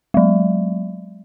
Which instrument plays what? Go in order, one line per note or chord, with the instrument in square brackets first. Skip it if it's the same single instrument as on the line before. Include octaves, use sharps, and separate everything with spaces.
[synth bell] F#3 G#3